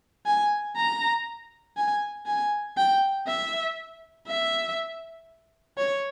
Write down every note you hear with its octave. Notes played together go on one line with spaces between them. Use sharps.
G#5
A#5
G#5
G#5
G5
E5
E5
C#5